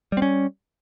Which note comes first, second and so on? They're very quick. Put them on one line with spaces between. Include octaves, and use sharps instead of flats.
G3 C4 C#4